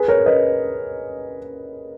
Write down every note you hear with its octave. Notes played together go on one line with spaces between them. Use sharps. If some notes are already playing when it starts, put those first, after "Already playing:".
Already playing: G#4 B4
A#4 C#5
B4 D#5